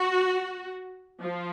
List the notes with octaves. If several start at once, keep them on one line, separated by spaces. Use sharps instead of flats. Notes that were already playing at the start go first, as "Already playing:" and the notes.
Already playing: F#4
F3